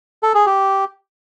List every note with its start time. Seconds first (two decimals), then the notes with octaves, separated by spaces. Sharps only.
0.23 A4
0.35 G#4
0.46 G4